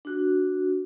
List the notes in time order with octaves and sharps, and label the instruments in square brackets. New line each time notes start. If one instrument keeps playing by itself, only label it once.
[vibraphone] D4 F#4